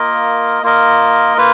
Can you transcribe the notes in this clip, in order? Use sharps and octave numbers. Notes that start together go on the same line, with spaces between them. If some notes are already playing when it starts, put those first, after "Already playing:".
Already playing: A#3 F4 A#4 D#5
A#3 F4 A#4 D#5
A#3 F4 B4